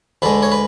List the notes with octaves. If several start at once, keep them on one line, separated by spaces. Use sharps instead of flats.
D2 D3 G#3 B4
C#5
B4